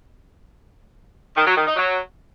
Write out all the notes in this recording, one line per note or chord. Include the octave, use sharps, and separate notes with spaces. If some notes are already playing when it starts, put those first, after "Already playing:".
D#3
F#3
D#3
D#4
F#3